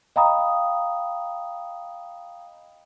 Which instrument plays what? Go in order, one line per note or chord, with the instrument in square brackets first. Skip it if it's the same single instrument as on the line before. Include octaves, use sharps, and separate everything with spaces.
[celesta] D#5 F5 G5 A#5 B5 D#6